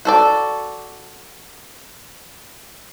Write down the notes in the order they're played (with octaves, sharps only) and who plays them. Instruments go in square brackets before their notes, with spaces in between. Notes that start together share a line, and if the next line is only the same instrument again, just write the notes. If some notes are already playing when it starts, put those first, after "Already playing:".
[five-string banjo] F#4 A4 D5